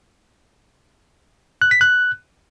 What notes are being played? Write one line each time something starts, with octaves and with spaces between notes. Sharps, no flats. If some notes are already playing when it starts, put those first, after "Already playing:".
F#6
B6
F#6